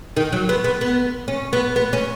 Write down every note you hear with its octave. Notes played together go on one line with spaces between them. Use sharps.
D#3
F#3
B3
B3
B3
C#4
B3
B3
C#4